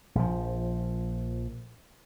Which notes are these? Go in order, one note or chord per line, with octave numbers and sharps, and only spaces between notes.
A#1 F3